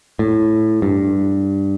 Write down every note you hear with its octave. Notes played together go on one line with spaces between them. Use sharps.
A2
G2